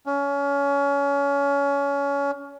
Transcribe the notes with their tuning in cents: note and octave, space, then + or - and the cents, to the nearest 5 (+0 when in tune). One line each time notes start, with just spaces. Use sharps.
C#4 +25